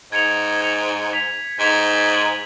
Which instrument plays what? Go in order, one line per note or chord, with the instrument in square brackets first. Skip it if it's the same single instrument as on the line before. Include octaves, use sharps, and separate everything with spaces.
[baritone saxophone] G#2 [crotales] G#6 C#7 F7
[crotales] G#6 C#7 F7
G#6 B6 F7
[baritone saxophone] G#2 [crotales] G#6 B6 F7
[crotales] G#6 D#7 F#7